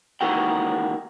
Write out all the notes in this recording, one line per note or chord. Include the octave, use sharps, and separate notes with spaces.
C#2 D#3 E3 A#3 F#4 G5